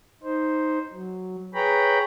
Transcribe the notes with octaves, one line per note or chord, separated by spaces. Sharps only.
D#4 C5
F#3
G#4 B4 C#5 G5 A#5 B5